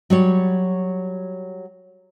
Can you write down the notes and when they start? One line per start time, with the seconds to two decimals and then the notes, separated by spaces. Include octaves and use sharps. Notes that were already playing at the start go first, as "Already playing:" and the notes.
0.10 F#3 G3 C#5